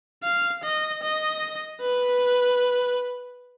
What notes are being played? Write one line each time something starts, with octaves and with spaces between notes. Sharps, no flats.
F5
D#5
D#5
B4